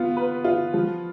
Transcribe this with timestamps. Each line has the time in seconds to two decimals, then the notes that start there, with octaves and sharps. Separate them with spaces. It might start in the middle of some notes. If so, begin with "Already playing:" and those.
Already playing: B3 F4
0.17 B4
0.44 F4
0.74 F3